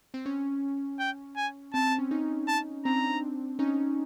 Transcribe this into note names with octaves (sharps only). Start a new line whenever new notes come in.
C4
C#4
G5
G#5
C4 A5
C4
C#4
C#4 D#4
A5
C4 D4 A#5
C#4 D#4